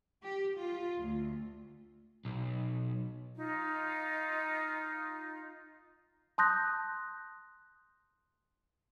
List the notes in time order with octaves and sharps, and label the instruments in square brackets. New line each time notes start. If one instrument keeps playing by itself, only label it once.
[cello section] G4
F4
D2
[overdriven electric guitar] B1
[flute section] D#4 F4
[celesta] A5 C6 D#6 F#6 G6 A#6